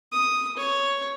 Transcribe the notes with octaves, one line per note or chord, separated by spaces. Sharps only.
D#6
C#5